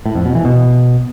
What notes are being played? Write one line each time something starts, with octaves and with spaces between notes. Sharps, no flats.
A2
F2
B2
E3
B2